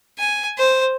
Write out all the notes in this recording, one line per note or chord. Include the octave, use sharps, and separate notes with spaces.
G#5
C5